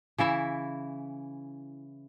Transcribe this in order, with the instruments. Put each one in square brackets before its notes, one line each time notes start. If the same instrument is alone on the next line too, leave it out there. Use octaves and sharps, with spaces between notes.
[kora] C#3 E3 E4 E5